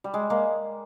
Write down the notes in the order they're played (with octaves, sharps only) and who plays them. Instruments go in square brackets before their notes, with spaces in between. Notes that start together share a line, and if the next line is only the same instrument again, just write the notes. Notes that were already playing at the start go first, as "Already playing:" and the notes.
[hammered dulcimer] G3
G#3
G#3 A#3